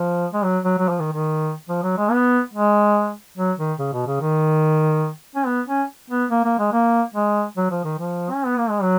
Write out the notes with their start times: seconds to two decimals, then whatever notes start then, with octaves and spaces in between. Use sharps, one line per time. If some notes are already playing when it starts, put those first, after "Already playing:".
Already playing: F3
0.33 G#3
0.44 F#3
0.65 F#3
0.78 F#3
0.89 F3
0.99 D#3
1.13 D#3
1.69 F3
1.83 F#3
1.98 G#3
2.11 B3
2.54 G#3
3.38 F#3
3.58 D#3
3.79 C#3
3.93 B2
4.07 C#3
4.21 D#3
5.36 C#4
5.46 B3
5.68 C#4
6.10 B3
6.31 A#3
6.44 A#3
6.59 G#3
6.73 A#3
7.14 G#3
7.57 F#3
7.71 F3
7.84 D#3
7.99 F3
8.33 C#4
8.46 B3
8.58 A#3
8.70 G#3
8.82 F#3